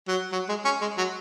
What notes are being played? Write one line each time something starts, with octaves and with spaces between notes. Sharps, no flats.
F#3
F#3
G#3
C#4
G#3
F#3